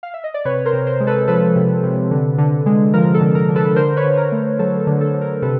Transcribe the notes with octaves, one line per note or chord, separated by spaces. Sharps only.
F5
E5
D#5
D5
C3 B4 C#5
A#4 C5
C3
A#4 C5
G#3
A4 B4
F3 A4 B4
C3
C3
D3
D3
G#3
F3 A#4
A4
D3
A#4
D3
A4 B4
D3 A#4 C5
B4 C#5
D3
A#4
A3
F#3 A4
A4
D3
A4
D3
A#4
C3 A4 B4